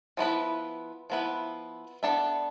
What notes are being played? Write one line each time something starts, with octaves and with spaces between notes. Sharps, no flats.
F3 G#3 B3 E4 B4
F3 G#3 B3 E4 B4
B3 D4 A4 E5